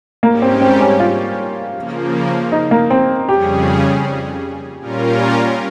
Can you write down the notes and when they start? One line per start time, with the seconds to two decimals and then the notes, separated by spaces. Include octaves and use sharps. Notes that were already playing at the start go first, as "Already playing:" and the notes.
0.23 G#2 G3 A#3 C#4 G4
0.42 C4
0.62 C4
0.81 C#4
1.00 F4
1.75 C#3 F3 A#3
2.52 D#4
2.71 A#3
2.90 C4
3.28 F2 C#3 G3 C#4 G4 G#4
4.81 A#2 G3 C#4 F4 A#4